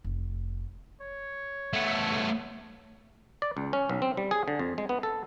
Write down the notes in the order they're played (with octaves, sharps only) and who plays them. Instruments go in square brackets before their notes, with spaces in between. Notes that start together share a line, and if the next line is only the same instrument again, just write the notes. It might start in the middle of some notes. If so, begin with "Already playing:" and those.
[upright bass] F1
[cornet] C#5
[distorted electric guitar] A3 B3
[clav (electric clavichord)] D5
C#2
C#4
B1
C4
G3
G#4
D3
F2
G#3
B3
A4